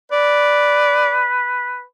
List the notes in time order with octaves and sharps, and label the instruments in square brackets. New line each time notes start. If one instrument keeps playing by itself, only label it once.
[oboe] B4 [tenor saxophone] D5